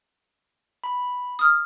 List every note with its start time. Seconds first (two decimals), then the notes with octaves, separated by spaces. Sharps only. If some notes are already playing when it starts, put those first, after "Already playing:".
0.84 B5
1.39 D#6 F6